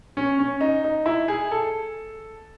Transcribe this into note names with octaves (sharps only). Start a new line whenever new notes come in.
C#4
C#4
D#4
D#4
E4
G#4
A4